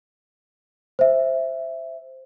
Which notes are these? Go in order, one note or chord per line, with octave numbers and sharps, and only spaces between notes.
C5 E5